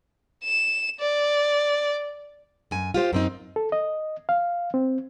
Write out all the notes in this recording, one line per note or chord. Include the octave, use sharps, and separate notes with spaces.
E7
D5
F#2 G#5
F4 G4 C5
F#2 C4 D#4
A4
D#5
F5
C4